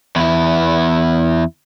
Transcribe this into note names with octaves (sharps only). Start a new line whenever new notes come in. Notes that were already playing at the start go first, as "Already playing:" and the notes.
E2 E4